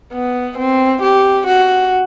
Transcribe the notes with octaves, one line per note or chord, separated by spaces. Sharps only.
B3
C4
G4
F#4